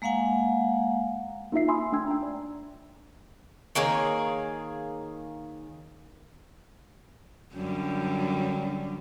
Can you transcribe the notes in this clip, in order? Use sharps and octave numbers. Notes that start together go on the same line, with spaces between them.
G#3 A#3 F5 F#5 G#5
A#3 D#4 F4 E5 C7
E5 G#5 B5 C6 D#6 E6
A3 D4 G5 E6 G#6
G5 A#5
D5
D#3 A#3 G#4 C#5
F#2 D3 G3